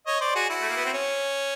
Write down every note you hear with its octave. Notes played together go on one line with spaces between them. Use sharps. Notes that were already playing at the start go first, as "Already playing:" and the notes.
C#5 D#5
C5 D5
F#4 G#4
E4 F#4
A3
A#3
B3
C4
C#4